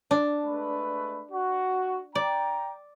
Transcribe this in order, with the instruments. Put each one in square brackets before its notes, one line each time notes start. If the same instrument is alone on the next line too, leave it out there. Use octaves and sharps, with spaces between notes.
[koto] D4
[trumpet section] G#3 A3 B4
F#4
[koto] D5 [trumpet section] G5 A#5